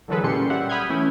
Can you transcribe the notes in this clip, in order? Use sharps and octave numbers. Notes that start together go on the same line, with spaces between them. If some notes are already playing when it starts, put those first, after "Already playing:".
D3 E3 F#3 G#3 A4 B4
A#2 G3 C#4 C6 C#7
G4 E5 F#5
B5 D#6 F6 G6 G#6
E3 A3 C#4 E4